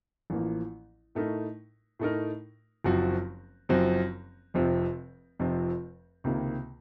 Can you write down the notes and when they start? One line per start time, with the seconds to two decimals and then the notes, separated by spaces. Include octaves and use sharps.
0.30 A1 A2 F3 A#3
1.15 A2 A3 D#4 A#4
1.99 A2 A3 D#4 A#4
2.84 F#1 F#2 F3 C4 F#4
3.69 F#1 F#2 F3 C4 F#4
4.54 F1 F2 C3 F3 C4
5.39 F1 F2 C3 F3 C4
6.24 C#2 C3 D#3 A#3